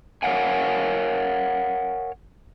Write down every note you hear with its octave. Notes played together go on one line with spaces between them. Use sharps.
A#4 C#5 D5 F5 F#5 G#5